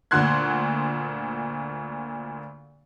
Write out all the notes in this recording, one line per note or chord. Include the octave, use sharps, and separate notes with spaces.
D2 A#2 F#5 C6 F#6 G#6